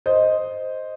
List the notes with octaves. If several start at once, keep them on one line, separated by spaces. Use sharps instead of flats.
C5 D#5